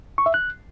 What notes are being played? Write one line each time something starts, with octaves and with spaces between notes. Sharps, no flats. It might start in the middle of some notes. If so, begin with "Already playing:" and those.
C#6
E5
F#6